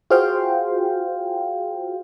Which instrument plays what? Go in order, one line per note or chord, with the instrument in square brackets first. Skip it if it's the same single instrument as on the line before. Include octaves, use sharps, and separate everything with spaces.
[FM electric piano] F4 F#4 G#4 C5 F5 G5